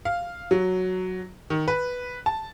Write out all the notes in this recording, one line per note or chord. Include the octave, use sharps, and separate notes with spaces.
F5
F#3
D#3
B4
A5